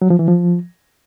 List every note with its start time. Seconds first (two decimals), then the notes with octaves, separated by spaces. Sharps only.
0.02 F#3
0.10 F3
0.19 E3
0.28 F3